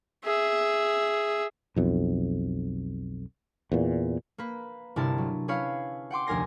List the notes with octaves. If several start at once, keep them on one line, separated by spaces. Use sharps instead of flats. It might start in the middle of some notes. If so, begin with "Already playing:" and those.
G#4 E5
B1 F2
E2 A#2
A#3 B4
G1 C3 E4 A#4 A5
F#3
C#4 E4 B4 C#5 F5
F#5 G5 C6 D6
F1 D2 A#4 G#5 A#6 C7